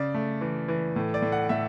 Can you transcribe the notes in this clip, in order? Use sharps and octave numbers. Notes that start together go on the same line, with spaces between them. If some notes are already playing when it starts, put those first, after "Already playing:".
Already playing: C#3 D5
A3
E3
E3
A2
D5
A2
F#5
A2 E5